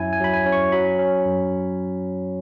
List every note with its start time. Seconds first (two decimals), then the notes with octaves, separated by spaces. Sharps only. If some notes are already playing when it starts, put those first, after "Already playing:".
Already playing: F#2 F#3 C#4 E4 E5 G#5
0.13 G#5
0.20 F#3 B5
0.34 G#5
0.46 C#4
0.52 C#6
0.72 F#3 B5
0.99 C#4
1.26 F#2